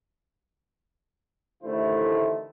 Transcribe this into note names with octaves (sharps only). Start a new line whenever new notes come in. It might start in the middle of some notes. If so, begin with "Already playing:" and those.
A1 D3 D#3 A3 E4 C5